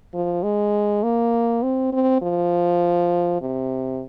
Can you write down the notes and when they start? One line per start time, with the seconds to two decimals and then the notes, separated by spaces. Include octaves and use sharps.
0.14 F3
0.43 G#3
1.03 A#3
1.62 C4
1.92 C4
2.22 F3
3.41 C3